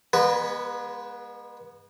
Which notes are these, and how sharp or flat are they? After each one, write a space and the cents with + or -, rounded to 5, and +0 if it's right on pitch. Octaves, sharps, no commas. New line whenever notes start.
G#3 -35 B3 -45 B4 +0